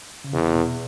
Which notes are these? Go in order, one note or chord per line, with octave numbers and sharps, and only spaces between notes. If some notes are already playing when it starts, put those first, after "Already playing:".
C#3
E2 C3
B2